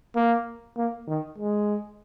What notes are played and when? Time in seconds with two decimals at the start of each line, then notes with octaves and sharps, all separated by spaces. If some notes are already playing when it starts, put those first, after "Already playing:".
0.16 A#3
0.77 A#3
1.07 D#3
1.38 G#3